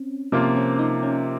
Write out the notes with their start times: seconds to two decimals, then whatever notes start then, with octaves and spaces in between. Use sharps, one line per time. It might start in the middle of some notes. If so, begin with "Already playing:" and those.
Already playing: C4 C#4
0.32 C3 F3 A#3 C#4 F4
0.56 C#4
0.79 D#4
1.03 C#4